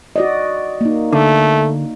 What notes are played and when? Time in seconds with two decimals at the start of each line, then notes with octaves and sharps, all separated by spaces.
0.16 F#4 D5 D#5
0.81 A#3 D#4
1.13 D3 A3